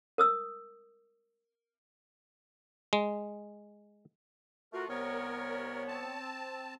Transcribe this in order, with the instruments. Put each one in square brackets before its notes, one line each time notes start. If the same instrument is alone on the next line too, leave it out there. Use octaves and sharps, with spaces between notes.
[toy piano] A#4 D#6 E6
[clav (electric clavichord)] G#3
[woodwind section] A3 F4 F#4 [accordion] A#4
[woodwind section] C2 B3 C#5 [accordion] A#4
[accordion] C4 A5